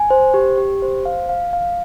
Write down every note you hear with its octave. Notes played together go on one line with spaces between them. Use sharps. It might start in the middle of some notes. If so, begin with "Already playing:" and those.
Already playing: G#5
C5
G4
G4
C5
F5
F5
F5